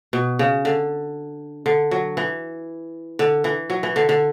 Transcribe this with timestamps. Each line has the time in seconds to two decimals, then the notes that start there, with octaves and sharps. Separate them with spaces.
0.13 B2
0.39 C#3
0.65 D3
1.66 D3
1.91 F#3
2.17 E3
3.19 D3
3.44 E3
3.70 F#3
3.83 E3
3.96 D3
4.09 D3